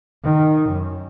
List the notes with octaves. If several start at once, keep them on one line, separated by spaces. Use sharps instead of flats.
D#3
F#2